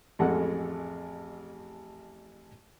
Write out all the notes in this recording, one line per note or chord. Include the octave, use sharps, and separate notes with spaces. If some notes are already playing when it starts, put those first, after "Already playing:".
A1 F2 G#3 A4 F#5